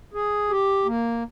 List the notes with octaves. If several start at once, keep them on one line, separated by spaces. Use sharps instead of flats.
G#4
G4
A#3